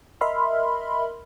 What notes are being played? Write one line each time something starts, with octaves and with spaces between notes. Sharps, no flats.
A#4 D#5 E5 B5 C6 F6